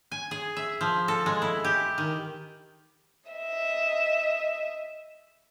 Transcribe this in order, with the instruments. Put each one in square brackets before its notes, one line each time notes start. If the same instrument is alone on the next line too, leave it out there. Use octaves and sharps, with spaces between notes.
[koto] G#5
G#4
E5
F3
A4
G#3
E4
G4
D#3
[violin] D#5 E5